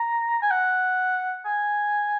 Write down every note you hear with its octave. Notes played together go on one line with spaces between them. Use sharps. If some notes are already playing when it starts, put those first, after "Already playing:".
Already playing: A#5
G#5
F#5
G#5